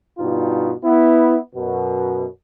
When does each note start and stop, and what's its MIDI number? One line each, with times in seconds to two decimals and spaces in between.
0.18 0.73 43
0.18 0.73 47
0.18 0.73 63
0.18 0.73 65
0.84 1.37 59
0.84 1.37 64
1.55 2.26 42
1.55 2.26 47